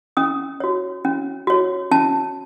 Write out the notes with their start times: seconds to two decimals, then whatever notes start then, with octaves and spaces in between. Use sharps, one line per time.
0.17 C#4 D#6
0.60 F#4 C#5
1.05 C#4
1.47 F#4 C#5
1.91 C#4 A5